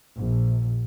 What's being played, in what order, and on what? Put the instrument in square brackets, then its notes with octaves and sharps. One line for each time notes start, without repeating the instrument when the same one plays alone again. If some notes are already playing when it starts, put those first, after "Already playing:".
[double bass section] A#1